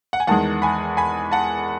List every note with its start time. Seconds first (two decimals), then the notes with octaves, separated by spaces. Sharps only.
0.13 F#5
0.20 G#5
0.27 E2 D#3 G#3 F#5 A5
0.62 G#5 B5
0.97 G#5 B5
1.32 F#5 A5